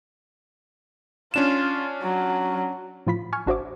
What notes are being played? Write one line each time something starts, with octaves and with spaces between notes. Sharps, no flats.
C#4 D4 F4 E7
F#3
A2 F3 F4 B5 B6
G#5 C#6 F6 G#6
G#1 D4 F#4 C5 E5 D6